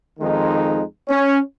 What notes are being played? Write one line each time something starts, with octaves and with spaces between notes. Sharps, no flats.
F2 D#3 G#3 D#4
C#4